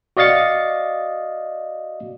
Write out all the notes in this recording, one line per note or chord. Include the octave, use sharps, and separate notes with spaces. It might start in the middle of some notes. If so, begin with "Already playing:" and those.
F#4 D5 D#5 F5 A6 C#7